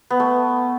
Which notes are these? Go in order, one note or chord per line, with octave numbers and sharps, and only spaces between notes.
B3
A3